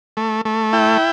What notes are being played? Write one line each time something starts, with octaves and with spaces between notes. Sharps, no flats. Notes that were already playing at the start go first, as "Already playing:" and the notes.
A3
A3
E4 G5